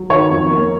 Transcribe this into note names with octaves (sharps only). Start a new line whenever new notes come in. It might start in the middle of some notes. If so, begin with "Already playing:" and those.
Already playing: F#3
D#3 C#5
F2
A#3